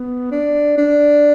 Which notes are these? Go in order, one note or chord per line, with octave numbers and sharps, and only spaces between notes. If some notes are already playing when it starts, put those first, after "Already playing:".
Already playing: B3
D4
D4